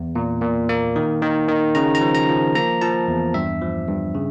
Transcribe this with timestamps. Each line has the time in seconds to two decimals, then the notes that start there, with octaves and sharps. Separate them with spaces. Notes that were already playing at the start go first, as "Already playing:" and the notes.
Already playing: E2
0.15 A#2
0.42 A#2
0.69 A#3
0.96 D#3
1.22 D#3
1.48 D#3
1.75 C#3 A#5
1.95 A#5
2.01 F3
2.15 A#5
2.29 F3
2.55 A#3 A#5
2.81 F3 A5
3.08 E2
3.34 G2 E5
3.62 F3
3.88 G2
4.14 C#3